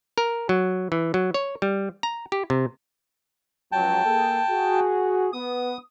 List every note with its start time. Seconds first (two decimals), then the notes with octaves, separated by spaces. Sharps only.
0.18 A#4
0.49 F#3
0.92 E3
1.14 F#3
1.34 C#5
1.62 G3
2.03 A#5
2.32 G4
2.50 C3
3.72 C#2 F3 F#3 G5 A5
4.04 A#3 G#4 A4
4.49 F#4 G#4
5.33 B3 D#6